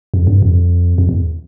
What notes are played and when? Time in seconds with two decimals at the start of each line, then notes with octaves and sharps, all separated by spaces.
0.14 F2
0.27 G2
0.42 F2
0.98 F2
1.09 E2